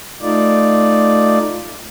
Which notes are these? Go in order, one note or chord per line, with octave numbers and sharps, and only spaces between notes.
A3 D#4 F4 D5